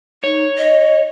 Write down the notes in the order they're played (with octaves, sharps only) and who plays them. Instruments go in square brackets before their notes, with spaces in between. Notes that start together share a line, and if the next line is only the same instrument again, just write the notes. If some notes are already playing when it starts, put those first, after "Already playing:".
[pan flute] D#4 [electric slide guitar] C#5
[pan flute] D#5